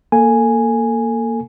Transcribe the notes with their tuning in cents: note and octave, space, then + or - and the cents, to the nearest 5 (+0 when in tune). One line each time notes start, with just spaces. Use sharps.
A#3 +0 A4 +20 G#5 +0